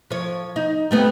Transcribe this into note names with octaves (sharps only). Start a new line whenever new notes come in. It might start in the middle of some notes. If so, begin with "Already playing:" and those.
F3 C#5
D#4
G3 A3 B3